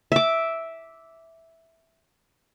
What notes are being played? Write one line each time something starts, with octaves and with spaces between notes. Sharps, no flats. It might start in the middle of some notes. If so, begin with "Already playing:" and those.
E5 D6